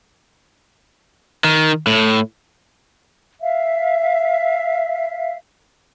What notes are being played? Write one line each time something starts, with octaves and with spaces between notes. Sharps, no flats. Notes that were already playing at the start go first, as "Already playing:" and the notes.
D#3
A2
E5 F5